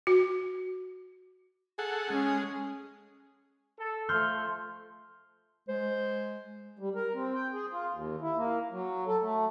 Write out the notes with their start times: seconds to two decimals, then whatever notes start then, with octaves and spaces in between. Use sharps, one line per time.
0.07 F#4
1.79 G#4 A4 F#5
2.10 G#3 C#4
3.77 A4
4.09 F3 A3 C6 F6 G6
5.69 G#3 C5
6.79 G3
6.95 A#4
7.14 C4
7.35 G5
7.54 G#4
7.72 F4
7.93 D#2
8.21 E4
8.37 A#3
8.72 F#3
9.07 A4
9.22 A3